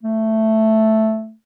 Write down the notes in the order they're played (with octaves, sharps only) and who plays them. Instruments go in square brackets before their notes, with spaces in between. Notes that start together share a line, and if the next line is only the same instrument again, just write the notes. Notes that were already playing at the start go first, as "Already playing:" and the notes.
[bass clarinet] A3